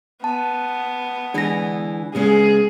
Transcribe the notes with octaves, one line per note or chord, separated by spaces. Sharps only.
B3 A5
D3 E3 G#3 D4 A#6
C#3 G#3 B3 G#4